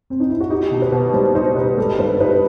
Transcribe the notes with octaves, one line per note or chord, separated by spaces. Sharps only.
C4
D#4
E4
F#4
D#4 G4
B2
B4
B2
G3 C5
D#4 C5
B2 B4
G3 A4
G2 B4
D#4 B4